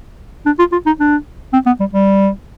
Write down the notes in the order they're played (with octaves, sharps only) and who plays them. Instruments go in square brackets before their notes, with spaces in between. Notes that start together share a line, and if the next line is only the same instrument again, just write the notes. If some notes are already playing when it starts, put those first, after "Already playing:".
[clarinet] D4
F4
F4
D#4
D4
C4
B3
G3
G3